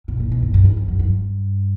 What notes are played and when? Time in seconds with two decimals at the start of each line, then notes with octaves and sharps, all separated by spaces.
0.08 B2
0.20 A#2
0.32 B2
0.43 G#2
0.54 G2
0.65 F#2
0.77 F2
0.88 F#2
0.99 G2